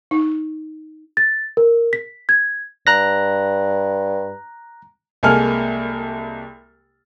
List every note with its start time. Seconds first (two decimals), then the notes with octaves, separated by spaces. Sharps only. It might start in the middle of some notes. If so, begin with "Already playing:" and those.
0.11 D#4
1.17 A6
1.57 A#4
1.93 B6
2.29 G#6
2.87 G2 A#5 F#6 A#6
5.23 C2 G#3 A#3 A4 G#5 F6